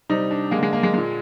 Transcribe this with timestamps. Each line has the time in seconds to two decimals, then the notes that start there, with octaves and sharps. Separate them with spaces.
0.10 C3 G3 D#4
0.31 D4
0.51 G#3 A#3
0.57 D3
0.63 G#3
0.73 A#3
0.83 G#3
0.94 A#2 G#3